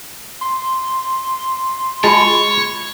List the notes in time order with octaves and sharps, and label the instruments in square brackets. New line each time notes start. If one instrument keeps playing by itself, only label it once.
[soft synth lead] C6
[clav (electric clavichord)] G#3 A5 [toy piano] F4 F#4 B5 [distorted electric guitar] C#5